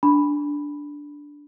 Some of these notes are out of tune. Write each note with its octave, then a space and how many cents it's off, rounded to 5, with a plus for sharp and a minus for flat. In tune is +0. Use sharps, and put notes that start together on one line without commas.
D4 -5 B5 +0